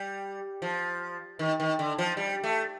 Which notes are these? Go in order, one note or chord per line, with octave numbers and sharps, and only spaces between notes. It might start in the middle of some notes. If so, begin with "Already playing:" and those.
Already playing: G3
F3
D#3
D#3
D3
F3
G3
A3